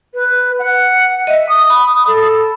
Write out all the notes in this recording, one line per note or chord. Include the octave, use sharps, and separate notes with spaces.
B4
F#5
D#5 E5
D#6
B5
A4